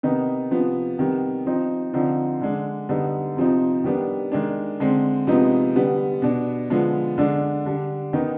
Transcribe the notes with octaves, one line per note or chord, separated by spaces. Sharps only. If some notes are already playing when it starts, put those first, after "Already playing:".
C3 D#3 B3 D#4
C3 F3 B3
C3 D#3 G3 B3
F3 C4 D#4
D3 F3 C4 D#4
D3 G#3 D4
D3 G3 B3 D#4
C3 F3 C4 D#4
D#3 G3 B3 D4
D#3 G#3 D4
D3 G#3 C4
C3 F3 G#3 B3 D#4
D3 G3 B3
B2 B3 D4
D3 F3 G#3 B3
D3 G#3 D4
D3 G3 D4
D#3 B3 D#4